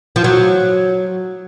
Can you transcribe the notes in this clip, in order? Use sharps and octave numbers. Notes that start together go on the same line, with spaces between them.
F3
F#3